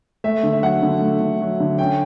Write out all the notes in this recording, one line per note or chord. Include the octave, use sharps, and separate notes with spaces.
A3 E5
D3
E5
F#3 F#5
D3
A3
D3
F#3
D3
C#4 G5